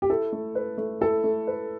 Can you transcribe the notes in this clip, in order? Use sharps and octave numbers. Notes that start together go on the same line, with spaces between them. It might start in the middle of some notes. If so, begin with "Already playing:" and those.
G4
E4 A4
A3
B4
A3
E4 A4
A3
B4